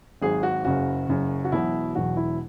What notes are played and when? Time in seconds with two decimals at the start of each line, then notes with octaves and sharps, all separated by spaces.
0.22 G#1 G#2 F#3 G#4
0.43 F#4
0.65 F#1 F#2 C#3 F#4
1.08 F#1 F#2 C#3
1.45 F#4
1.52 E1 E2 B2 F#3 E4
1.95 E1 E2 B2 F#3 F#4
2.17 E4